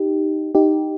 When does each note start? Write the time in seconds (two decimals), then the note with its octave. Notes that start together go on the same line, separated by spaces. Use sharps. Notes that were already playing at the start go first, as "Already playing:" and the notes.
Already playing: D#4 G4
0.55 D#4 G4